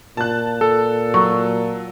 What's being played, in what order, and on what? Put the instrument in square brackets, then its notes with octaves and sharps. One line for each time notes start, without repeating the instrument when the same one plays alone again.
[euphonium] A#2 [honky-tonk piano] A5 F#6
[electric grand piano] A4
[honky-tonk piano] F#3 [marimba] C#6